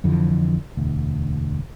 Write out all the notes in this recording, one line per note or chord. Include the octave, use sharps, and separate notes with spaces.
F2 D3 E3 F3
E1 D2